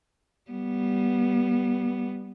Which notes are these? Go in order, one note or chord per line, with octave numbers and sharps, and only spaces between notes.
G3 B3